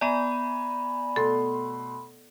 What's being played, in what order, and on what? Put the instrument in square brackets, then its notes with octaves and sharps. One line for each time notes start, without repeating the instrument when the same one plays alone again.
[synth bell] B3 D5 [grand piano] G#5 A#5 D#7 [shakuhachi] B5
[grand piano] B2 A3 C6 [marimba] A4